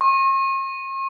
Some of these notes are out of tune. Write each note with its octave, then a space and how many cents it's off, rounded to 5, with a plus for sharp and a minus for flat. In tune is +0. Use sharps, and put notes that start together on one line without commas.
C#6 -45